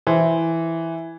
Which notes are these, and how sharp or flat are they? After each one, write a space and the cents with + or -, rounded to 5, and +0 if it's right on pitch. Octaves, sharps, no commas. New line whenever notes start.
E3 +0 C5 +0